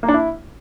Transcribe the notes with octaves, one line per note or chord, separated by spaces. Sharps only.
A#3
D4
E4